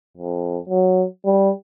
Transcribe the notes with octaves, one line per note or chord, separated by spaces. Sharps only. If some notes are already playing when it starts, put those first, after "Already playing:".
F2
F#3
G3